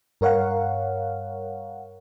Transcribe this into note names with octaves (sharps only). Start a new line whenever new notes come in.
G2 A#4 C#5 F5 F#5